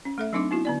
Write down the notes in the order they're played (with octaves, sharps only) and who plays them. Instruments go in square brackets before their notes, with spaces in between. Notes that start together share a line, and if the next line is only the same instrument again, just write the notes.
[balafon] C#4
A3 A4 E5
F#3 C4 D4 D#4 D6
B3 E4 F#4
D3 B3 D5